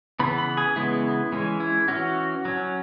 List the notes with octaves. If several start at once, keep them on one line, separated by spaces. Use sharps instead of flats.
C#3 E3 B3 B5
B5
G#4
C#3 E3 G#3 B3 E4
E3 G#3 C#4
E4
E3 C#4 F#4
F#3 C#4